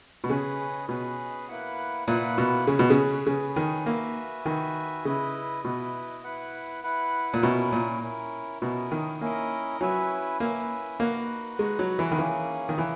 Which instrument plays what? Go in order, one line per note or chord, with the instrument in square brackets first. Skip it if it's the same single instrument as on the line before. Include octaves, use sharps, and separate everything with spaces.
[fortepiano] B2
[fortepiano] C#3 [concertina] C#4 G#4 B4 D#5
[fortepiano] B2 [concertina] C#4 G#4 B4 D#5
[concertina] A#3 E4 B4 F#5
[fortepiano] A#2 [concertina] A#3 E4 B4 F#5
[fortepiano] B2
[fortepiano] C#3 [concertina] C#4 G#4 B4
[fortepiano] B2
C#3
[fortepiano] C#3 [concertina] C#4 G#4 B4
[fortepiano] D#3
[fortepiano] A#3 [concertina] F#4 B4 E5 G#5
[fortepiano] D#3 [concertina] F#4 B4 E5 G#5
[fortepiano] C#3 [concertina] E4 B4 D#5
[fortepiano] B2 [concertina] E4 B4 D#5
[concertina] E4 B4 F#5
E4 B4 F#5
[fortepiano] A#2
[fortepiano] B2 [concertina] C#4 E4 A#4
[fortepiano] A#2
[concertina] C#4 E4 A#4
[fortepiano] B2 [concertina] C#4 E4 A#4 D#5
[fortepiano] D#3
[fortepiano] A#3 [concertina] C#4 E4 A#4 D#5
[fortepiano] F#3 [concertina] C#4 E4 B4 E5 G#5
[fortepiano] A#3 [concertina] C#4 E4 B4 E5 G#5
[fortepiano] A#3 [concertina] D#4 F#4 B4 F#5
[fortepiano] G#3 [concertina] D#4 F#4 B4 F#5
[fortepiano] F#3
E3
D#3
[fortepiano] E3 [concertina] A#3 C#4 G#4
[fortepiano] D#3
[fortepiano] E3 [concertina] A#3 C#4 G#4